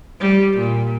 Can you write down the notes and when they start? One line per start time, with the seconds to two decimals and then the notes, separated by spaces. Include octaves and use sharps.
0.20 G3
0.58 A#2